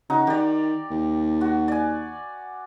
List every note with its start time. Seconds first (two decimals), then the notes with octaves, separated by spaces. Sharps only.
0.10 C#3 D#4 F#4 A#5
0.27 D#3 G4 D5
0.91 D#2
1.41 F#4
1.68 D5 G#5